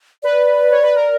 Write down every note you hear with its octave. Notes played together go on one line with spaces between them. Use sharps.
B4 D5
C#5
B4
A#4